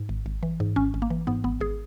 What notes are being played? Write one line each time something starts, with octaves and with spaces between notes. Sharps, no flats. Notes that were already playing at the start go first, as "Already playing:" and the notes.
Already playing: G#2
G#1
G#1
E3
G#2
G#1 C#4
G#1
A#3
E3
G#2 B3
G#1 B3
G#1 G#4